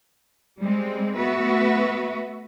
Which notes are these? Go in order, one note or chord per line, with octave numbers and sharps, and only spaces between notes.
G3 G#3 C4
A3 B3 F#4 B4 E5